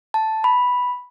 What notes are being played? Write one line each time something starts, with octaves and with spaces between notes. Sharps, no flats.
A5
B5